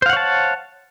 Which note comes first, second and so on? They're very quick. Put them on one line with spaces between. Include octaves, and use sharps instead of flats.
C5 F5 F#5 C#5 A5